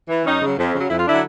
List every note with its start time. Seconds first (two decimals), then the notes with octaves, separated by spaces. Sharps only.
0.08 E3
0.24 F#2 C#4 D#4
0.41 C#3 F#3
0.58 F2
0.74 C#3 F#3
0.89 F2 E4
0.98 F4
1.06 D3 F#3 D4 E4